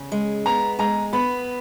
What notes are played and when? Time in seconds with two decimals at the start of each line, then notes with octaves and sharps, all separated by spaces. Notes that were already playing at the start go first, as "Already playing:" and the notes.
Already playing: C#3
0.12 G#3
0.46 B3 A#5
0.79 G#3 A#5
1.13 B3 B5